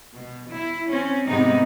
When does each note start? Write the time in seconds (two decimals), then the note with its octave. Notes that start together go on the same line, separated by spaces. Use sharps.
0.16 B2
0.53 E4
0.90 C4 C#4
1.28 G#2 C3 B3 D#4